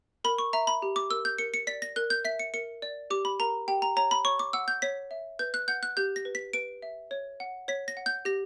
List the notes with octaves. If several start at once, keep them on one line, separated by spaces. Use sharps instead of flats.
A#4 B5
C#6
E5 A#5
B5
G4
D6
A#4 E6
G6
A#4 C#7
C#7
D5 B6
A#6
A#4 F#6
G6
E5 B6
C#7
A#4 C#7
D5
G4 D6
B5
A#4 A#5
G4 G5
A#5
C#5 A#5
B5
C#5 C#6
D6
F#5 E6
G6
C#5 B6
E5
B4 G6
F#6
F#5 G6
F#6
G4 G6
A#6
B4
B6
B4 D7
E5
C#5
F#5
C#5 B6
A#6
F#5
G6
G4 A#6